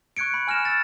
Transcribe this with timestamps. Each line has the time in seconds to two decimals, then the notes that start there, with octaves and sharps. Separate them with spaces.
0.17 C#6 F#6 G#6 C#7 D7
0.34 B5
0.47 G#5 F6 A#6 E7
0.65 E6 A6